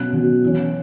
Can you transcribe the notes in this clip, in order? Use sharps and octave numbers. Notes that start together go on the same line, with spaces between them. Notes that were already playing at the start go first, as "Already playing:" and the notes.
Already playing: B2 F#3 C#4 F#6
B2 F#3 C#4
E3 C#4